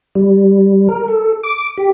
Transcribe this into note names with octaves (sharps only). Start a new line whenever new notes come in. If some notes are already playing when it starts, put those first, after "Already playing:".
G3
A#4
A4
D6
G4